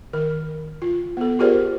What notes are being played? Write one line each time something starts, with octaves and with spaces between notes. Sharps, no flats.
D#3 A#4
F4
B3 A4
F4 G4 G#4 A#4 C5 D5